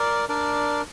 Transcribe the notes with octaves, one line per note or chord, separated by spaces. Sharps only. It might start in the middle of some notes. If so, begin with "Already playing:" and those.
Already playing: A#4 D5
D4 A#4 D5